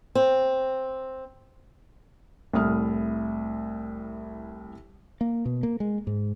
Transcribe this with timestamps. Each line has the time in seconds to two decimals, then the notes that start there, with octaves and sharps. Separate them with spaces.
0.15 C4
2.53 C2 A2 D#6 F6
5.21 A#3
5.45 B2
5.63 A#3
5.80 G#3
6.07 G#2